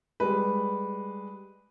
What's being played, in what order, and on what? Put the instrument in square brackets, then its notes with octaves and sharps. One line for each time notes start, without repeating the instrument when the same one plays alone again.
[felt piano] G3 G#3 [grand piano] B4